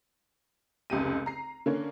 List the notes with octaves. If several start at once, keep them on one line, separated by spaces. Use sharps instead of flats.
F1 C#2 G4 D#7
A#5 C7
D3 A#3 C#4